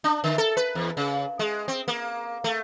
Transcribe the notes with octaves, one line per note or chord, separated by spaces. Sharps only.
D4
D3
A4
B4
E2
C#3
G#3
C4
A#3
A3